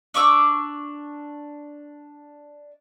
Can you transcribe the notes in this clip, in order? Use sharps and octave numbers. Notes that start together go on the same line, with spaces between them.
D4 C#6 D6 E6